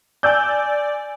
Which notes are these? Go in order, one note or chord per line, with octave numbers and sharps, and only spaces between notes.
D5 G#5 E6 G6